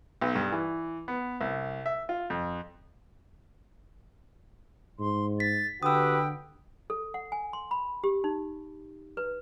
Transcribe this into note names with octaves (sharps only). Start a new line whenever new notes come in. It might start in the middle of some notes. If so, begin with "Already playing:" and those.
B1
G2
E3
B3
C2
E5
F4
F2
G#2 C6
A6 B6
D3 F#4 G4 B4 G5 D#6 E6
A4
F#5
G#5
C6
B5
G4
D#4
B4